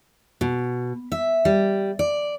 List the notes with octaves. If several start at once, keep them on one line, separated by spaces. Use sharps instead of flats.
B2
E5
G3
D5